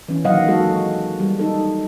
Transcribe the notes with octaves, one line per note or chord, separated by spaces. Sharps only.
E3 C#4
A#2 D#3 F#3 D#5 F5 F#5
G#3 F#4 A4
F#4
G3
D#4 A4